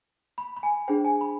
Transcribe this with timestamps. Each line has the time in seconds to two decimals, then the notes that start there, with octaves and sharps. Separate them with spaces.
0.38 B5
0.57 B5
0.63 G#5
0.88 D4 G#4 C5 G5
1.05 G#5
1.21 B5